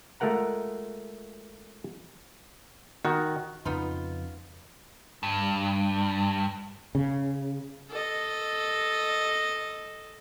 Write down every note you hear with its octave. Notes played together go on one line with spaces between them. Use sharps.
G#3 A3 F4 A#4 F#5 A#5
D#3 F#4
F2 C#3 F3 B3 D#4 F4
G2
C#3
A4 D#5